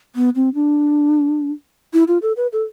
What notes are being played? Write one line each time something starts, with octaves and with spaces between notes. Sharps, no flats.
B3
C4
D4
E4
F4
A4
B4
A4